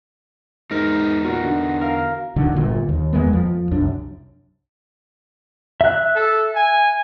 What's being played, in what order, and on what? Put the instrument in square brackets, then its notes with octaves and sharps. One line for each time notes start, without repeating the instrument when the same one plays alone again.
[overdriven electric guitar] E2 D#4 [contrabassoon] G#2 [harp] A#4
[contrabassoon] A#2 [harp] F#4 A#4
[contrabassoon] D3
[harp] A#4 F5
[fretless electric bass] D2 D3 D#3 F#3
G1 A#2
D#2
E2 G#3 A#3 B3
F2 F3
C2 F#2 D4
[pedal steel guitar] E5 F#6
[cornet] A4
G#5